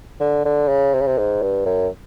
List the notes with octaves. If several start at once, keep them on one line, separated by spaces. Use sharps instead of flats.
D3
D3
C#3
C3
C#3
C3
G#2
G2
F#2